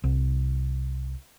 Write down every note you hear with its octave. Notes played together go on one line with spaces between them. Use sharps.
C2